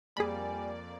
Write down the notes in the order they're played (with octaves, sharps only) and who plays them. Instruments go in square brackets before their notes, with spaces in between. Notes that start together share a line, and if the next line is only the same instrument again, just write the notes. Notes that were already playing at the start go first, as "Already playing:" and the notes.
[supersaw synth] F2 A#3 D5 [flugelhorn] G3 [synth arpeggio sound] G#4 B5 [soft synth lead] G#5